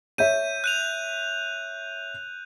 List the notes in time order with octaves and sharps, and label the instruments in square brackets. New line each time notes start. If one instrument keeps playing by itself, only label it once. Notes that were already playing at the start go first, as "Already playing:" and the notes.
[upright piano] C#5 E5 [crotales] G6 D#7
[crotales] F#6 D#7 F7